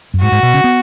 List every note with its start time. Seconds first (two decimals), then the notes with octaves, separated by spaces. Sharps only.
0.14 F#2
0.22 G#2 F#4
0.32 G#2
0.43 B2
0.54 C#3
0.64 B3